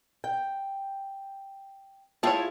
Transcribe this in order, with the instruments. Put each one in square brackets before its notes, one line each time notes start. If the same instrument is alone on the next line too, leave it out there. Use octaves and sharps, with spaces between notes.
[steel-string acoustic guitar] G5
[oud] E4 F4 G#4 [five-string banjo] C#5 G5 A5